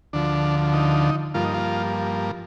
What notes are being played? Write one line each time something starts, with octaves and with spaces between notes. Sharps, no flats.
D2 D3 F3 D4
D#4
G2 F3 A#3 F4
D#4
F4